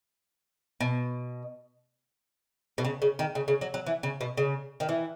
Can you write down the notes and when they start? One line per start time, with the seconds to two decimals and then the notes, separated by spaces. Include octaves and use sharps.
0.80 B2
2.78 B2
2.85 C#3
3.02 C#3
3.19 D#3
3.35 C#3
3.48 C#3
3.61 F#3
3.74 F#3
3.87 E3
4.03 C#3
4.21 B2
4.37 C#3
4.80 D#3
4.89 E3